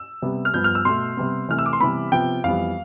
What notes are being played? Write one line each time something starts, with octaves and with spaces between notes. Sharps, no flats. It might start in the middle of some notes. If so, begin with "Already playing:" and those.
Already playing: E6
C3 G3 B3
F6
G2 F3 B3 G6
F6
E6
B2 A3 C6
C3 G3 B3
C3 E3 A3 F6
E6
D6
C6
C3 E3 G3 B3 B5
C3 F3 B3 G5
F2 E3 G3 B3 F5